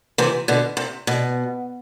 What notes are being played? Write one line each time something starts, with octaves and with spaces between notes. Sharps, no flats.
C3 E3
B2 D3
C3
B2